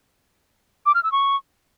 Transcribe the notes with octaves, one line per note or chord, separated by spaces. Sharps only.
D6
F6
E6
C#6